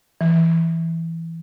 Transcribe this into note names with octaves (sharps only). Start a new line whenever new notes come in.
E3